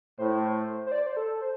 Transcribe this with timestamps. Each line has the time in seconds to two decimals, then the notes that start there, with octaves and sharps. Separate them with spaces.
0.18 A2 C5
0.86 C5
0.92 D5
1.06 C5
1.17 A4
1.41 C5